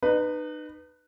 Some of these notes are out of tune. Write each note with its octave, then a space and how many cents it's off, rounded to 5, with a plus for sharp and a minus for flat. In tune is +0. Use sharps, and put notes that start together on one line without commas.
D#4 -35 B4 +0